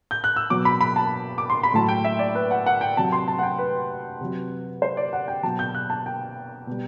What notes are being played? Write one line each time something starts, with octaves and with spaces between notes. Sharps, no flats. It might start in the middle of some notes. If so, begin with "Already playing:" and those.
G6
F#6
E6
B2 F#3 D6
B5
B5
A5
D6
C6
B5
A2 F#3 A5
G5
E5
D5
B4
F#5
F#5
G5
C3 F#3 A5
C6
A5
F#5
G5
B4
C3 F#3
C5
D5
F#5
G5
B2 F#3 A5
G6
F#6
A5
G5
B2 G3